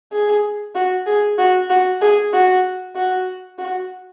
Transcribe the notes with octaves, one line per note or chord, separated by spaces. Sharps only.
G#4
F#4
G#4
F#4
F#4
G#4
F#4
F#4
F#4